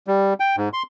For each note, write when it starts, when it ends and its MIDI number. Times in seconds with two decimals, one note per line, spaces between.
0.07 0.34 55
0.40 0.56 79
0.57 0.69 44
0.73 0.83 84